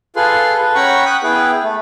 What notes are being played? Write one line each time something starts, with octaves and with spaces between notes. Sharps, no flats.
F4 G#4 A4 B4 C6
A4 B4
C#4 F#5 G5 A#5 B5 C#6
F#5 G5 D#6 F#6
B3 E4 G#4 B4 G5
A3